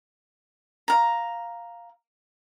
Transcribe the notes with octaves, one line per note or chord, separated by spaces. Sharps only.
F5 A#5